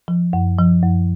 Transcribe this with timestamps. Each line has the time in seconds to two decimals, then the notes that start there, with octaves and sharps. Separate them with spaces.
0.08 F3
0.33 F#2
0.58 F3
0.83 F#2